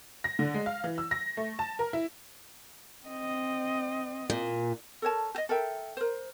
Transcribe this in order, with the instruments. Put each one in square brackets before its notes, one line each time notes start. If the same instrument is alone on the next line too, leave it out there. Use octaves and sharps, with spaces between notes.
[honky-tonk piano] A#6
D3
G#3
F5
E3
E6
A#6
A3
A5
A#4
E4
[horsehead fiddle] C4 D#5
[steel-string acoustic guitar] A#2
[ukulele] A4 A#4 C#5 A5
G4 D#5
A4 A#4 E5 G5
A#4 C5